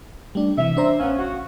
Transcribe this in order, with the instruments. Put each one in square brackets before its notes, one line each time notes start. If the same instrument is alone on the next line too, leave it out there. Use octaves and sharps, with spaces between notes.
[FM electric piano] G3 A3 D4
[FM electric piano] C3 E3 [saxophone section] E5
[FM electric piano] D4 C5 A#5
[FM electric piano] A1 F5 [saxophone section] B3 C#4
[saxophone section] F#4